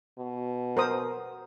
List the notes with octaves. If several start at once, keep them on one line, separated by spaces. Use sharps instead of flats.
B2
A#4 C5 D#6